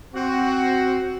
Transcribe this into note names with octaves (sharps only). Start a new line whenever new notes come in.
C4 F#4